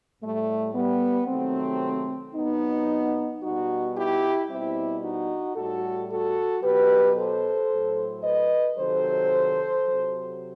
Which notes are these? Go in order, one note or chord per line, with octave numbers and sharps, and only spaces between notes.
A2 G3 A3
G3 B3
C3 D#3 F#3 A3 C4
C3 F#3 B3 D#4
B2 G3 D#4 F#4
E4 G4
B2 G3 C4 E4
D#4 F#4
A2 G3 F#4 A4
F#4 A4
B2 F#3 G4 B4
A4 C5
A2 F#3
B4 D#5
C3 D#3 F#3 A4 C5
C3 F#3